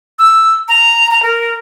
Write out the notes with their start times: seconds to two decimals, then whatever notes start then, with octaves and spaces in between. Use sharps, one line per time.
0.19 E6
0.68 A#5
1.11 A#5
1.23 A#4